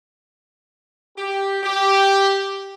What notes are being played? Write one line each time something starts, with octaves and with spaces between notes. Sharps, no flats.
G4
G4